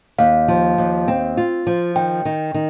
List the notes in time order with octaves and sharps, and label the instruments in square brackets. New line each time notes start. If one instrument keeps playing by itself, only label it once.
[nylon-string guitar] D#2 [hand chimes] F5
[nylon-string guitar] F3
D#2
C4
F4
F3
[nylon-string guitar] D#3 [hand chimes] G5
[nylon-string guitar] D#3
D#3